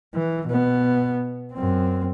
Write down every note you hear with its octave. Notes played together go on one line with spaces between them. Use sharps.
E3
B2 B3
F#2 C4